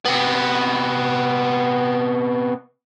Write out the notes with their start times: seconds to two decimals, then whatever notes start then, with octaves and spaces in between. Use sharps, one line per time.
0.05 C3 B3